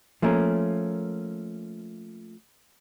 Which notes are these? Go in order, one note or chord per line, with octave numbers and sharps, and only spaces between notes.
F3 A3 A#3 C#4 A#4